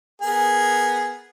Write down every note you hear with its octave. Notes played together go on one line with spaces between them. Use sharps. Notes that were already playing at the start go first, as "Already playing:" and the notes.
B3 G#4 A#4